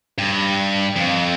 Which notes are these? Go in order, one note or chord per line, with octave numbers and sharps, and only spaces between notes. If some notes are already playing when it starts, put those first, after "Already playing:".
G2
F2